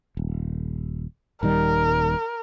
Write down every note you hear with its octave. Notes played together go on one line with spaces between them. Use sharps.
D#1
D#1 D#3 G3 A#4